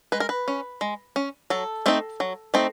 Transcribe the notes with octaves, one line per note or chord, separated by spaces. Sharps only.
G#3 B4
A#4
B4
C#4
G#3
C#4
F#3 A4
A3 C4 D#4
F#3
A3 C4 D#4